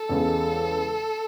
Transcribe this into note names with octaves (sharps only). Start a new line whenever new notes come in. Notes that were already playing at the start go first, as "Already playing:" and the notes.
Already playing: A4
E2 C#3 G#3